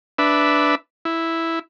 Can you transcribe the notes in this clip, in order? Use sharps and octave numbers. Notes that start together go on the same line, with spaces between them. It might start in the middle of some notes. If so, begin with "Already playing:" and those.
D4 B4 E5
E4